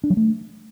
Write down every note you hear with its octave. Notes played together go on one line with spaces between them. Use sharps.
D4
F#3
A3